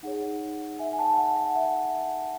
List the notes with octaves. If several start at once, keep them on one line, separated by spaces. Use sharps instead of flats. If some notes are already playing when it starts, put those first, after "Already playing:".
D#4 G#4 C#5 F#5
E5 G#5
G#5
F#5 A5
F#5 A5
F#5
E5